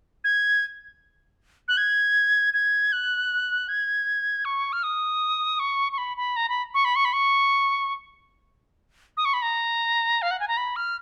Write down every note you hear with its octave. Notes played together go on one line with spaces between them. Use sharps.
G#6
F#6
G#6
G#6
F#6
G#6
C#6
F6
D#6
C#6
C#6
B5
B5
A#5
B5
C#6
B5
C#6
B5
C#6
D#6
C#6
B5
A#5
F5
F#5
G#5
A#5
B5
F6